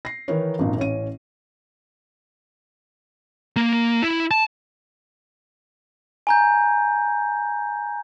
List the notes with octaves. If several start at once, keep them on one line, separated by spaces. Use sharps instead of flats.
A#6 C7
D#3 E3 D#4 A#4 B4 C#5
G#1 F#2 A#2 D4 D#4
A1 C#4 C#5 D#7
A#3
E4
A5
G#5 A#5 G6